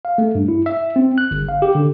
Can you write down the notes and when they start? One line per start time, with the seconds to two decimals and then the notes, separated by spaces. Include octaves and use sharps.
0.05 F5
0.18 A3
0.35 G2
0.48 E4
0.66 E5
0.96 C4
1.18 F#6
1.31 G1
1.49 F5
1.62 G4
1.75 D3